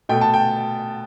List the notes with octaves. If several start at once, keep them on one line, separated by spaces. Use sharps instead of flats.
B2 A3 G5
A5
G5